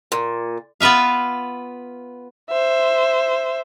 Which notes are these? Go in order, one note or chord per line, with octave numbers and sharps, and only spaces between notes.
A#2
B3 F4 B4 E5 F5
C5 E5